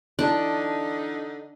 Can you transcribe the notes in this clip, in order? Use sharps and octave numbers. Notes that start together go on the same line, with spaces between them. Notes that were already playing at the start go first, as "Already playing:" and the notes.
D3 E3 D4 D#4 A5